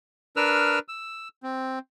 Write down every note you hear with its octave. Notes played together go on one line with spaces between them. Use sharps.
D4 A#4 B4 E6 F6
E6
C4